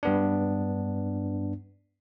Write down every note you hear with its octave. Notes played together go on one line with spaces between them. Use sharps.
G2 B3 D4